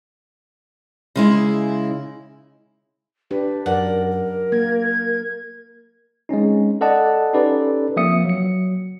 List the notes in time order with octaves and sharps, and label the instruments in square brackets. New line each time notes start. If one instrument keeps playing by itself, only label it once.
[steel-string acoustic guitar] C#3 G#3 E4
[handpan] D4 G4 [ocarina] B4
[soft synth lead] F#2 [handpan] F#3 D5 [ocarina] A#4 [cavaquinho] F#5
[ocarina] A#4
[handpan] A#3 [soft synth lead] G#6
[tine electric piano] G#3 C4 C#4 D#4
A4 D5 D#5 F#5 A5
C#4 D#4 G4 A4 B4 D5
F3 A#3 C4 E5 D#6 C#7
F#3 C#7